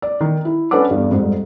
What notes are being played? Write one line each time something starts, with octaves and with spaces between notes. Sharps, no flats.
D5
D#3
E4
C#4 D4 A4 B4 F#5 D6
E2 G2
F2 G#2 G3